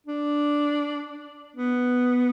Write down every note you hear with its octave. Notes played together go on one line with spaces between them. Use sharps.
D4
B3